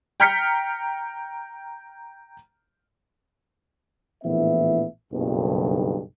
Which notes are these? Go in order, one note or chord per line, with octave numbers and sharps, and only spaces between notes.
G5 A#5 F6 G6 B6 C#7
A#1 A2 E3 B3 E5
F#1 B1 G2